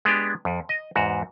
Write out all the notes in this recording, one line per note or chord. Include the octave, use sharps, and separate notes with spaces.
G#3 B3 D4 G4
F2
D#5
E2 G#2 F#4